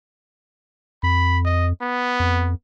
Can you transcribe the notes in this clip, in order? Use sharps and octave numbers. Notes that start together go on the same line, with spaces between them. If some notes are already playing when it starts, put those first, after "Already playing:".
F2 B5
D#5
B3
F2